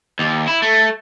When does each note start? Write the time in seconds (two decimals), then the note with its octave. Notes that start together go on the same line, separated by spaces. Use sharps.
0.19 D#2
0.48 E4
0.62 A3